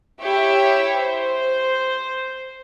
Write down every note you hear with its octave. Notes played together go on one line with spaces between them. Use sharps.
E4 G4 C#5 E5
C5